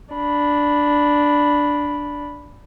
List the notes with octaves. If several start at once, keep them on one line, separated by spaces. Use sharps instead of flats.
D4 B5